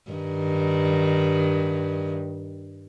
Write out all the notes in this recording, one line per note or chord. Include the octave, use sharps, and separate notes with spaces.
G2 D#3